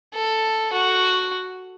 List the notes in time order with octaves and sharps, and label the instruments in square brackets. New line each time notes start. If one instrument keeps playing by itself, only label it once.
[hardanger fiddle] A4
F#4